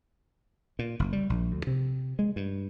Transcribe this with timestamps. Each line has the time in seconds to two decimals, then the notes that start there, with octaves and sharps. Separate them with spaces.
0.79 A#2
0.99 F#1
1.13 G3
1.30 A#1
1.52 D2
1.67 C3
2.19 G#3
2.36 G2